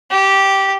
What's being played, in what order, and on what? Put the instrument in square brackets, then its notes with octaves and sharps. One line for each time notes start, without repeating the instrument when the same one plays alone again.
[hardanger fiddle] G4